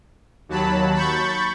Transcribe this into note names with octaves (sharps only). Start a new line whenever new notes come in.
D#2 F#3 A5 B5
B5 C#6 G6 A6